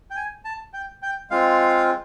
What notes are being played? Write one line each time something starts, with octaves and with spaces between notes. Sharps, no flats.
G5
G#5
A5
G5
G5
G#3 C4 F4 F5